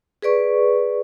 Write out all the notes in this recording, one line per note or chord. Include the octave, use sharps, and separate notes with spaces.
G#4 B4 D5 C#6